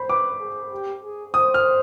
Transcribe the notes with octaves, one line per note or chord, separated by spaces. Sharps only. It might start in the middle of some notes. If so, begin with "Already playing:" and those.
Already playing: C5 B5
B4 D6
G#4
G4
G#4
C5 D#6
F6